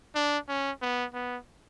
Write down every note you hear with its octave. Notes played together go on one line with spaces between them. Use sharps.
D4
C#4
B3
B3